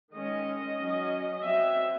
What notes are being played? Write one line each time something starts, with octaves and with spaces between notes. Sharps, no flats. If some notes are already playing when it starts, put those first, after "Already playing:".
D#3 G#3 C#4 D#5
F#3 C#4
F#3 C4 E5